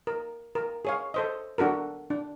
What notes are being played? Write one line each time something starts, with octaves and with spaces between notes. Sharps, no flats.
A#4
A#4
G#4 C#5 F5
A4 C5 D#5
D4 F#4 A4 A#4
D4